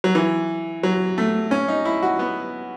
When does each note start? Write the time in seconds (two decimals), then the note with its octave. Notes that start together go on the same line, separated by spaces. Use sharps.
0.04 F#3
0.15 E3
0.83 F#3
1.18 A3
1.51 C#4
1.68 D#4
1.85 E4
2.03 F#4
2.19 B3